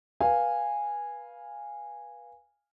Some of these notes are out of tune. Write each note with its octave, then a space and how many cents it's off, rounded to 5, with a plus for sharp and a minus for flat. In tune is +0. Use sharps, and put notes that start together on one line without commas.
B4 -25 F5 +0 G#5 -10